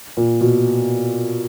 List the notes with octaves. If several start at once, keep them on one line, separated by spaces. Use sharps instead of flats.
A#2
B2